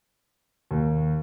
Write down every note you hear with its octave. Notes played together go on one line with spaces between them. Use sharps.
D#2